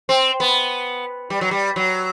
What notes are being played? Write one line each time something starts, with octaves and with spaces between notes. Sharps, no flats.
C4
B3
G3
F#3
G3
F#3